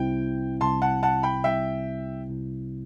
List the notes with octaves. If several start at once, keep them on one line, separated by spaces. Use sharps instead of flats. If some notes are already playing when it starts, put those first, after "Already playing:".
Already playing: C2 C3 G3 C4 E4 G5
C2 C3 G3 C4 E4 A5 C6
F#5 A5
F#5 A5
G5 B5
C2 C3 G3 C4 E4 E5 G5
C2 C3 G3 C4 E4